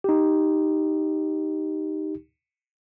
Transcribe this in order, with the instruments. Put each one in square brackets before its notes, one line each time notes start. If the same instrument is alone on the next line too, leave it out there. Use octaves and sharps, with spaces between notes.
[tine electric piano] D#4 G4